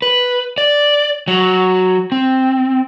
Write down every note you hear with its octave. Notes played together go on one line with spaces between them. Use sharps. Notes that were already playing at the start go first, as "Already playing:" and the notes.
B4
D5
F#3
C4